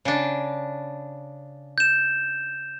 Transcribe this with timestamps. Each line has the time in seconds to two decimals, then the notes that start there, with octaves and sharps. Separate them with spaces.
0.05 C#3 D4
1.78 G6 E7